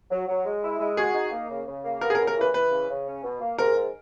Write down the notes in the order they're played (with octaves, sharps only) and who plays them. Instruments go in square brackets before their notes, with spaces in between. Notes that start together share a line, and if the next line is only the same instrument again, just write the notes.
[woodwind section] F#3
F#3
G#3
E4
G#3
[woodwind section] F#4 [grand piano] G#4
[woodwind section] D#4
A#3
C#3
C#3
A#3
[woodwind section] B3 [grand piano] A#4
[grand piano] G#4
A#4
[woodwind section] C#3
[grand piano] A#4
[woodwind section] E3 [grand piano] B4
[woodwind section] E3 [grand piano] B4
[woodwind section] C#3
C#3
C#4
B2
A#3
[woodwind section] G#2 [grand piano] A#4
[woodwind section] G#2